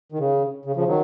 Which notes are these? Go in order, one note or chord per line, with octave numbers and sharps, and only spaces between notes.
D#3
C#3
C#3
C#3 F3
D#3 F#3